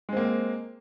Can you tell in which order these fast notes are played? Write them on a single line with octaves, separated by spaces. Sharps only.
G#3 C4 A#3